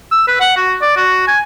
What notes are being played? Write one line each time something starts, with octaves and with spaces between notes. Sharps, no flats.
E6
B4
F#5
F#4
D5
F#4
G#5